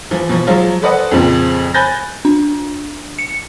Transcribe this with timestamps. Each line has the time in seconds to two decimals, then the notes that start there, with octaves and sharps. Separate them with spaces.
0.11 E3 F3
0.29 B2 F3
0.47 F3 F#3 G#3 F4
0.82 A4 B4 C5 D5 D#5 F#5
1.11 F2 A#2 C#3 F3 C4
1.74 G#5 B5 F#6 G6 A6 A#6
2.25 D4
3.19 C#7